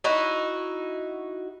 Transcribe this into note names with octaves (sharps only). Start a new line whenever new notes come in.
D#4 E4 F#4